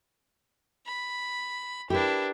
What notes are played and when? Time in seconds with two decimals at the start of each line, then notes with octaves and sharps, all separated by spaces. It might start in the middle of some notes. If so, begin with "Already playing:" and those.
0.86 B5
1.90 D4 E4 G4 A#4 B4